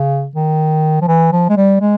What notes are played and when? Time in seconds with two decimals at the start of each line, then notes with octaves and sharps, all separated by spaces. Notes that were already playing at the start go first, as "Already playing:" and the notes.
Already playing: C#3
0.35 D#3
1.01 F3
1.08 E3
1.32 F3
1.49 G#3
1.57 G3
1.81 G#3